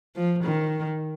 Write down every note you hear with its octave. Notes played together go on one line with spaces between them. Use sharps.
F3
D#3